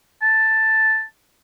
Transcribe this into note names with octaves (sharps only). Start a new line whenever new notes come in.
A5